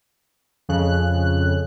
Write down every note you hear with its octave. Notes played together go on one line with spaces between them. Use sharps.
F2 C#3 F#6